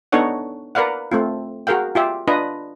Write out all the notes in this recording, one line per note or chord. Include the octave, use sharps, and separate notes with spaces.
B3 D4 D#4 A4 C#5 F#5
A#4 B4 D5 F5 F#5
A3 C4 F4
F#4 G#4 A#4 F5 G5
F4 G4 E5
D4 F4 B4 D#5